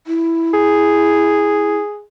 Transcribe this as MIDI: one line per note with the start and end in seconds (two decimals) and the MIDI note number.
0.07 1.77 64
0.54 2.02 68